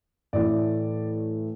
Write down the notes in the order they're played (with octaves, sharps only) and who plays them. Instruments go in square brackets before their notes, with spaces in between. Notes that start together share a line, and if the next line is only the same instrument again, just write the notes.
[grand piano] A2 E3 A3 D5